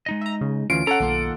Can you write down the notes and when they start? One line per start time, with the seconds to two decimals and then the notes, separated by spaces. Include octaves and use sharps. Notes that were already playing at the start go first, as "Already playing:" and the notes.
0.06 G#3 D#4 D#5
0.21 E5 A#5
0.41 C#3
0.70 D2 E3 C#4 F4 C7 D7
0.87 C#4 A4 F#5 A#5
1.00 B1 D#3 A#3 F4